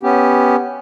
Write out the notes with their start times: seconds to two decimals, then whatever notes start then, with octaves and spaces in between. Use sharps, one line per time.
0.03 B3 C#4 G4